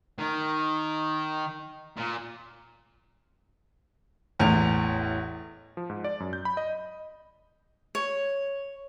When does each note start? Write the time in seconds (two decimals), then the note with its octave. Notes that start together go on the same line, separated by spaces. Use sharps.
0.18 D#3
1.97 A#2
4.39 A1 E2 A2 F7
5.77 F3
5.90 G#2
6.04 D5
6.20 F#2
6.33 G6
6.45 B5
6.57 D#5
7.95 C#5